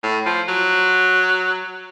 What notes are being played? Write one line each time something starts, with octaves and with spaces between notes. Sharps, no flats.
A2
F3
F#3